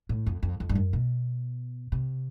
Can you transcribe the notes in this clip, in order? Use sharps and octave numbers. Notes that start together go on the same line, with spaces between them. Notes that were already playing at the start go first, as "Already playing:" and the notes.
A2
F2
F2
F2
G2
F#2
B2
C3